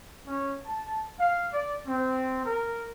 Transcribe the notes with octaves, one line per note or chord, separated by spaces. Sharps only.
C#4
A5
F5
D5
C4
A#4